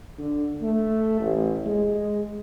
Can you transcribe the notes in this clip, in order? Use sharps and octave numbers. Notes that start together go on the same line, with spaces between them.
D3
A3
A1
G#3